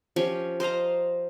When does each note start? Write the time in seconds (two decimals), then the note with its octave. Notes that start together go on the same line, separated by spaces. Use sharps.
0.16 F3 C#4 G4 C#6
0.60 C5 D#5 F5 A#5